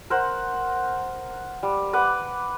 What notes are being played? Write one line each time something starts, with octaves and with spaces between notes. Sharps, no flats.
A#4 C5 F#5
G3
B4 F#5 D6